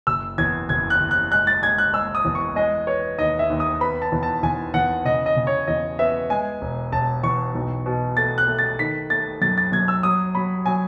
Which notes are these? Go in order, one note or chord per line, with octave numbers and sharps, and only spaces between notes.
F#1 E6
E2 G#6
F#1 G#6
F#6
F#1
F#6
G#3 F#6
A6
G#3 G#6
F#6
G#3 E6
D#6
E2
C#6
G#3 D#5
B3 C#5
D#2 D#5
E5
D#2
D#6
B3 B5
A5
E2
A5
E2 G#5
E2 F#5
C#3 D#5
D#5
C#3
C#5
E2 D#5
B3 E5
G#3 G#5
E1
E1 A5
E2 C#6
B1
B2
A3 A6
F#6
A3
A6
D#3 B6
A3 A6
F#2 A6
A6
F#2 G#6
E6
F#3 D#6
F#3 B5
F#3 G#5